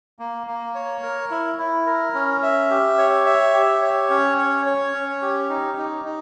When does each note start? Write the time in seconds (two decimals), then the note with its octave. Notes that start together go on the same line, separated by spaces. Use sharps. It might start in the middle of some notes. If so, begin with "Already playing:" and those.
0.19 A#3
0.47 A#3
0.75 C#5
1.03 A#4
1.31 E4
1.58 E4
1.86 A#4
2.14 C#4
2.43 E5
2.70 G4
2.98 C#5
3.26 E5
3.54 G4
3.82 C#5
4.10 C#4
4.38 C#5
4.66 C#5
4.93 C#4
5.22 G4
5.49 D#4
5.78 D#4
6.05 D#4